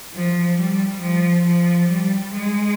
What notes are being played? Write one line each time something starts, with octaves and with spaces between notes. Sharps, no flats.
F3
G3
F3
F3
G3
G#3